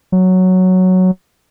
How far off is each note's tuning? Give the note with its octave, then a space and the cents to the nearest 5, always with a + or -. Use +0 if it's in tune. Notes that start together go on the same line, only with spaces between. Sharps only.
F#3 +0